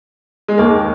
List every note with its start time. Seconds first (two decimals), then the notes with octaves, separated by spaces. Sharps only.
0.48 G#3
0.58 D#2 D#3 A#3